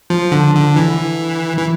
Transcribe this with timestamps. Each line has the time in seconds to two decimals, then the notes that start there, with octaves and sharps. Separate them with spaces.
0.10 F3
0.32 D3
0.55 D3
0.76 E3
1.57 E3